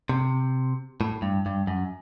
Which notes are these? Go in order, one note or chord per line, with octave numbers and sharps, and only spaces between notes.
C3
A2
G2
G2
F#2